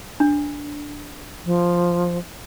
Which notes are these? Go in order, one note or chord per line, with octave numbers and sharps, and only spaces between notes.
D4
F3